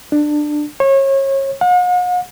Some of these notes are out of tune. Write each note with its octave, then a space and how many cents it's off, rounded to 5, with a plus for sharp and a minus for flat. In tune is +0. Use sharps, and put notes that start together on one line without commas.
D4 +20
C#5 -30
F#5 -45